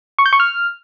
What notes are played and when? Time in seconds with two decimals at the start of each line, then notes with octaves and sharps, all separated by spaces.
0.19 C#6
0.26 G6
0.33 C#6
0.40 F6